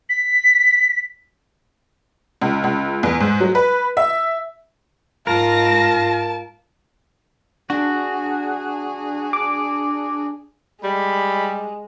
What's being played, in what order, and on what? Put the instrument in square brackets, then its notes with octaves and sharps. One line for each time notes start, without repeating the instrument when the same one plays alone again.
[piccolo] B6
[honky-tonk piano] C#2
C#2
E2
G#2
F#3
B4
E5
[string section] G#2 A#6 [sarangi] F4 [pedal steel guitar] A#4 [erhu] A5
[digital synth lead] D4 [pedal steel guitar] F#4 [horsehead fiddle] G#4
[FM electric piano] D6
[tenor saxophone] G3 [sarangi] G#3 [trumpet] B5